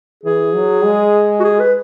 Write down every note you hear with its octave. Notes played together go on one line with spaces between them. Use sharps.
E3 G#4
F#3
G#3
F#4
G#4
B4